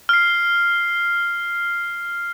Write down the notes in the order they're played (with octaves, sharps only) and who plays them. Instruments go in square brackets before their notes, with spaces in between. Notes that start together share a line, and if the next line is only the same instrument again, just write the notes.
[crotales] F6 C7